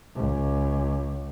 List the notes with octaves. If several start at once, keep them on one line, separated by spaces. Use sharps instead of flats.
C#2